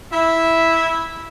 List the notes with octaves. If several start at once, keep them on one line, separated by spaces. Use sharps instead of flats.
E4 E5